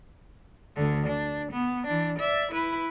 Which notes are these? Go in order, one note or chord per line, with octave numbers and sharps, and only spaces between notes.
D2 D3
D4
B3
E3 D4
D5 E5
E4 B4